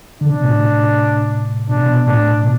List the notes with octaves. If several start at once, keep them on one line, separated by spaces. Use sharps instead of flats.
D3 D4
C3
B2
A2 C3
B2 D4
C3
B2
A2 D4
B2